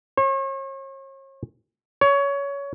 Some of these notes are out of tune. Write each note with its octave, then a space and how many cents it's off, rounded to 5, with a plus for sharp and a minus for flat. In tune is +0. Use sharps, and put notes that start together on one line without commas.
C#5 -40
C#5 +20